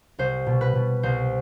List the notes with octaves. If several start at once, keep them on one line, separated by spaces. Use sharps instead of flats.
C2 C5
B2
B4
B2
C2 C5